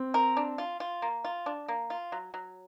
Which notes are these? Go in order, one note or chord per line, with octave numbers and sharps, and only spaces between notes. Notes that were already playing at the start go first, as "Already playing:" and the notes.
Already playing: C4
A#4
D4
F4
F4
A#3
F4
D4
A#3
F4
F#3
F#3